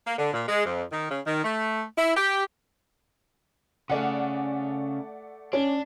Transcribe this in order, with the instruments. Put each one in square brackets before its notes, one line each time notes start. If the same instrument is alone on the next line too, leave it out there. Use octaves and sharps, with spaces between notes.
[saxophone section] A#3
D3
A#2
G#3
F2
D#3
C#3
D#3
A3
E4
G4
[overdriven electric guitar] C#3 [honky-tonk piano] A3 D5 F#5
[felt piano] C#4 [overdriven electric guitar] D4